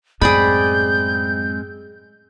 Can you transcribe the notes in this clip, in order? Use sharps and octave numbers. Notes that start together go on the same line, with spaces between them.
F#2 A2 G#3 C4 G#4 D5 B5 G6